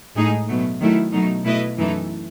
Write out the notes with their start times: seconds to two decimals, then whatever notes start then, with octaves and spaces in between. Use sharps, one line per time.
0.15 A2 G#3 D#4 G#4
0.47 B2 F#3 A3
0.80 D#3 F#3 A3 E4
1.13 B2 F#3 A3 D#4
1.44 B2 A3 E4 B4 D#5
1.77 F#2 E3 A3 D#4 A4